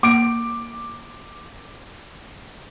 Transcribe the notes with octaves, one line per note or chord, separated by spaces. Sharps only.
A#3 D6 D7